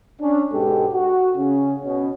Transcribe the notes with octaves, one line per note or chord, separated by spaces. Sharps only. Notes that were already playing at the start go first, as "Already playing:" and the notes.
C#4 D4
G#2 B2 G#3 G4 A4
F#4
C#3 C#4
B2 C#4